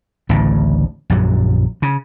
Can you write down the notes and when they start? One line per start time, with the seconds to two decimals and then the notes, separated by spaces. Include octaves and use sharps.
0.29 A1 D2 A2 C#3
1.10 A#1 F#2 F#3
1.82 C#3